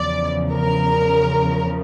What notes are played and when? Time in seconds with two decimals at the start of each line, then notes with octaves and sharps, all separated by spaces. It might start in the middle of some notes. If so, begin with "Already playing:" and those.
Already playing: E2 C#3 F3 D5
0.52 A#4